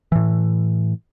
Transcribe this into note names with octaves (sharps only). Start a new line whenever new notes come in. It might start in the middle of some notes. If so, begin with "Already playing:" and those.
A2 E3